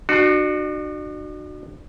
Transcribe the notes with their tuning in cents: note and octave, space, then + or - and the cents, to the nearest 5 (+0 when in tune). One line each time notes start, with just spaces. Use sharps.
D4 +45 F#4 +0